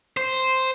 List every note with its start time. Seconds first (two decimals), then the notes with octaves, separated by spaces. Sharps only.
0.17 C5